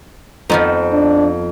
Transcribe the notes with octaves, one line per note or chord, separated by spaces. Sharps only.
F2 F3 B3 D#4
D4